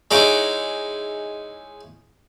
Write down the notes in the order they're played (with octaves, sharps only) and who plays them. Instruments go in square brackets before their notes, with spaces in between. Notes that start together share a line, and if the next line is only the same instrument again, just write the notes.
[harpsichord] G#3 C#4 D#4 E4 F#4 D6